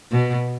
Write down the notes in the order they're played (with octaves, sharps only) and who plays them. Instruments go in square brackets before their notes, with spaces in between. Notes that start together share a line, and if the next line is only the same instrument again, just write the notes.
[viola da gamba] B2